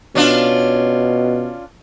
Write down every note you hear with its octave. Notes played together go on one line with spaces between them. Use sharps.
B2 C#4 D4 F4